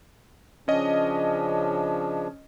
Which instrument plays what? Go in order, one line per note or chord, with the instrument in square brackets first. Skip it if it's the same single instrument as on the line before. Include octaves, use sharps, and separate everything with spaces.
[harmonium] C#3 F3 D4 [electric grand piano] C#4 D#5